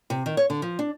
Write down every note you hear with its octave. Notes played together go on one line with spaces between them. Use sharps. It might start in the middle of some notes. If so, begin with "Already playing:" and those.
C3
D#3
C#5
D3
F3
D4